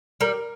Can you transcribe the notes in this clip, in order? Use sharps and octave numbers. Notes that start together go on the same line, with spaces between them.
G3 A#4